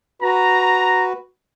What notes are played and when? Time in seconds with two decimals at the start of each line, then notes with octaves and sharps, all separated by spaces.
0.22 F#4 B4 A#5